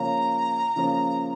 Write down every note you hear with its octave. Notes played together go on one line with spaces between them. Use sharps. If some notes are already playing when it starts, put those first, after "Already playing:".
Already playing: C#3 F3 A#3 C#4 F4 A#5
C#3 F3 A#3 C#4 F4